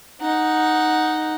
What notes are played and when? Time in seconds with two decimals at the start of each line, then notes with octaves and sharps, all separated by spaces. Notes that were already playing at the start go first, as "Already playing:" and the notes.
0.21 D#4 F#5